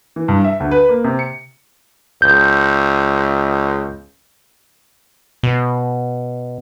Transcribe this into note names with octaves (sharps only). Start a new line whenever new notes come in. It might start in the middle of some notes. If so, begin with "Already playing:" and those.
E3
G2
E5
D2
B4
A#3
C3
C#7
C#2 G6
B2